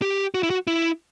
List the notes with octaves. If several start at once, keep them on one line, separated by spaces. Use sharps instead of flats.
G4
F#4
E4
F#4
E4